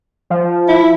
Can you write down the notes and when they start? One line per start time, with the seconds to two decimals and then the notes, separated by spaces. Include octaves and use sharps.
0.30 F3
0.68 E4